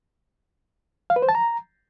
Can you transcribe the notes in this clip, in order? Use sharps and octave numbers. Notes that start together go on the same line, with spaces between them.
F5
B4
C5
A5
A#5